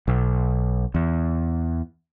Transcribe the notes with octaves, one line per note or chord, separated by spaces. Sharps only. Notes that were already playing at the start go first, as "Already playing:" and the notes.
B1
E2